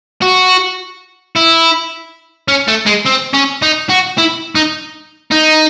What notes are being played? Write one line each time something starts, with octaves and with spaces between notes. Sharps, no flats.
F#4
E4
C#4
A3
G#3
C4
C#4
D#4
F#4
E4
D#4
D#4